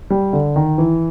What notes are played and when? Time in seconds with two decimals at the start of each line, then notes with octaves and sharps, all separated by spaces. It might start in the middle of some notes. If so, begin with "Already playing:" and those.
0.10 G3
0.33 D3
0.56 D#3
0.78 E3